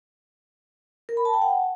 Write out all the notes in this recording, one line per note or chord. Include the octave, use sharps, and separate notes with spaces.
A#4
B5
A5
G5
F#5